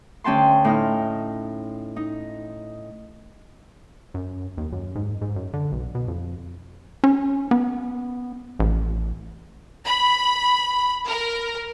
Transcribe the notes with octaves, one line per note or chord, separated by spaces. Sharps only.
D2 C#4 G5 A5 C6
A2 D#4 F6
D#4
F#2
D#2
F#2
G#2
G#2
F#2
D3
B1
B2
F2
C#4
B3
A1
B5
A#4